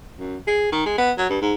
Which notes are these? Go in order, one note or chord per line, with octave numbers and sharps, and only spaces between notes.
F#2
G#4
D#3
G#3
B3
F#3
G2
G#2